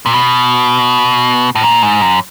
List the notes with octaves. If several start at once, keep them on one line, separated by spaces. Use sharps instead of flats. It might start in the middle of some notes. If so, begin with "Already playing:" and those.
A#2
B2
A2
A#2
G#2
F#2